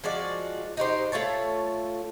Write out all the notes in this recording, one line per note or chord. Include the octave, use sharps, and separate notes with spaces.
F3 G#3 F#4 D5
D#4 F#4 G4 C5
A3 F4 C#5 A5